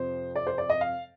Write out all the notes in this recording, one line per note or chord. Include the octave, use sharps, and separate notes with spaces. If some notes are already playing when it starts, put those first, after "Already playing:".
Already playing: F2 C3 F3 C5
D5
C5
D5
D#5
F5